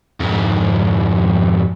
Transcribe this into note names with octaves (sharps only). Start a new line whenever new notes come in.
F2 G#2